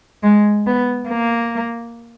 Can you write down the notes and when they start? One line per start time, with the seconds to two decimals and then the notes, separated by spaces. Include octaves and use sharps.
0.23 G#3
0.67 B3
1.09 A#3